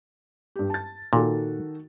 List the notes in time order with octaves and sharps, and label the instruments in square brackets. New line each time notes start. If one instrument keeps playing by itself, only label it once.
[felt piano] G2 G4
A5 A6
[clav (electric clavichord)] A#2 [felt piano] D#3 F#4 A4